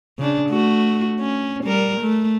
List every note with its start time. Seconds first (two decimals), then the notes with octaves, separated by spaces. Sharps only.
0.19 C#3 D4
0.49 A3 F#4
1.20 C#4
1.65 G3 A#4
2.01 A3